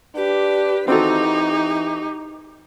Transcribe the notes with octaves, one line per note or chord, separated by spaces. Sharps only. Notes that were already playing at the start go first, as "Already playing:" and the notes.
D4 G4 B4
E3 C4 D#4 F#4 G4 A4